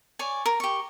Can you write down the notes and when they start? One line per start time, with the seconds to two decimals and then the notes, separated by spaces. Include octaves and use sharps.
0.19 C#5 D5 G#5
0.46 A#4
0.60 G4 C#6